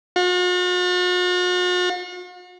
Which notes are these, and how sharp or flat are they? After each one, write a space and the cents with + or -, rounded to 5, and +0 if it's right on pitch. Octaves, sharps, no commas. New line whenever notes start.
F#4 -45